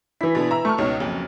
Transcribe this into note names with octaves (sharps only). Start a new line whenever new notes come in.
E3 E4 B6
B2 D3 B3
E5 A#5 E6
A3 C#6 F6
C#2 B2 D#4 C#5
F#1 F2